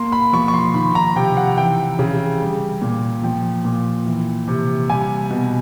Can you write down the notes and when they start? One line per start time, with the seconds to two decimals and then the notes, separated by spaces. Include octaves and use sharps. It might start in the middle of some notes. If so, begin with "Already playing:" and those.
Already playing: A#3 C6
0.12 B5
0.33 F3 C#6
0.48 C#6
0.54 C6
0.74 D#3 B5
0.95 A#5
1.16 C3 G5
1.37 F#5
1.57 E3 G5
1.99 C#3
2.41 G3
2.82 A#2
3.23 F3 G5
3.65 A#2
4.06 E3
4.48 C3
4.90 G3 G#5
5.30 B2